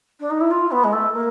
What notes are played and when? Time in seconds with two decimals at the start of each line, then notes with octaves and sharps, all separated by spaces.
0.19 D4
0.30 D#4
0.40 E4
0.50 F4
0.71 B3
0.83 G#3
0.92 A3
1.13 A#3